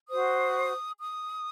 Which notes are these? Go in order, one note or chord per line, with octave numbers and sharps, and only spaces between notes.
F#4 C5 D#6
D#6